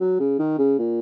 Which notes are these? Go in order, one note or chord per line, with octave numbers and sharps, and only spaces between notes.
F#3
C#3
D#3
C#3
A#2